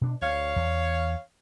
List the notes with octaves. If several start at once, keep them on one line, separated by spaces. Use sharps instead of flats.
B2 D4
D2 C#5 F5
E2